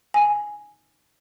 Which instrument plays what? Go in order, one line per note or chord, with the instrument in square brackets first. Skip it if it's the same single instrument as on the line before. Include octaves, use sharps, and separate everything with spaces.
[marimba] G#5